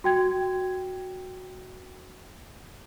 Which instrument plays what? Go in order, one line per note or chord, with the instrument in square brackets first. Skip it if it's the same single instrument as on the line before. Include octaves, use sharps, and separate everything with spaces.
[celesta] F#4 G5 G#6